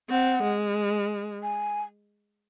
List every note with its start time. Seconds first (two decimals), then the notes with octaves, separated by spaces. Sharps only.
0.10 C4 F#5
0.43 G#3
1.43 G#5